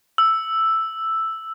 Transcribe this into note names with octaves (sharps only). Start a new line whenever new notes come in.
E6